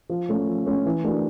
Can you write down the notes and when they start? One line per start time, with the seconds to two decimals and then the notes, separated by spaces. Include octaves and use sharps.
0.10 F3
0.29 A3 C#4
0.47 F3
0.66 A3 C#4
0.85 E3
1.04 A3 D4 F#4 A#4